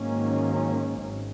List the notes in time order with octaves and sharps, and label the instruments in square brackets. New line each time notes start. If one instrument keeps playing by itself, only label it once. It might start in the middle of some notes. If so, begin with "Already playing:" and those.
Already playing: [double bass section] G#2 D#3 F#3 A#3 C#4
G#1